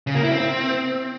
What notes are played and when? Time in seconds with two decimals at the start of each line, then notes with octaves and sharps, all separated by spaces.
0.07 C#3
0.15 A#3
0.23 E4
0.31 C4